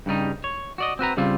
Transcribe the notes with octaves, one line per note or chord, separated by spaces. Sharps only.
G2 C#3 G3 D#4
C#5
F#4 D5 D#5
C4 F#4 B4 A#5
C#3 G3 C4 F4